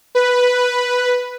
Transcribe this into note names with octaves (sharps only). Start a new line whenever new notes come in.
B4